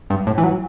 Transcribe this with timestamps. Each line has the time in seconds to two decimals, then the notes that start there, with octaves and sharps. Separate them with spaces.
0.10 G2
0.27 A2
0.38 E3
0.44 F#3